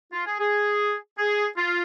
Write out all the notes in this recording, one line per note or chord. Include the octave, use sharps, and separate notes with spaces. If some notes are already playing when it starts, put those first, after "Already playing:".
F4
G#4
G#4
G#4
F4